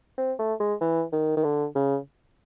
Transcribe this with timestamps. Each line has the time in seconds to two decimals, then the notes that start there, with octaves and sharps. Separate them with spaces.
0.18 C4
0.39 A3
0.60 G#3
0.81 E3
1.12 D#3
1.37 D#3
1.44 D3
1.75 C#3